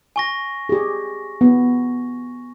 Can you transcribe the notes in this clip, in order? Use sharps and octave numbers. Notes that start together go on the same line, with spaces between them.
G#5 C#6 A#6
G4 G#4
B3